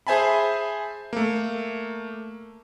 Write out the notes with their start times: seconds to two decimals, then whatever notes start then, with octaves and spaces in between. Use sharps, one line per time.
0.07 G#4 C5 E5 G#5 A5 B5
1.13 A3 A#3